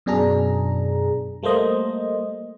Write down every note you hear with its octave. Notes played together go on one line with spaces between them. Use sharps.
F#2 B2 D4 G#4 A#5
G3 A3 A#3 C5 D#5